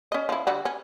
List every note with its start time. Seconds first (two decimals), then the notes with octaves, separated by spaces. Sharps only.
0.12 C#4 D#5
0.29 F3 E4
0.47 D3 G3 F#4
0.65 C#4